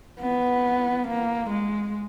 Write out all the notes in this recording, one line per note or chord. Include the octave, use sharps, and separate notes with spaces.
B3
A#3
G#3